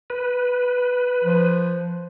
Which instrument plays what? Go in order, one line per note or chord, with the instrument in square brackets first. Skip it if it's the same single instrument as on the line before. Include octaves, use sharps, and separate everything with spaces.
[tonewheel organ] B4
[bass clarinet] F3